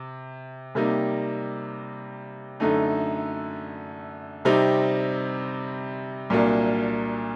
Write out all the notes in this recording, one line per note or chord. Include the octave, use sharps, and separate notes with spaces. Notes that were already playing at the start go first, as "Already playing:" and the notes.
Already playing: C3
C3 G3 A#3 D#4
F#2 D3 A3 D#4
C3 G3 C4 D#4
C2 A#2 F#3 A#3 D4